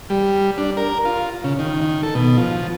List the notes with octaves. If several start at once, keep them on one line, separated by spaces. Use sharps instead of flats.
G3
D4
A#4
F4
C#3
D#3
D#3
A4
B2
F3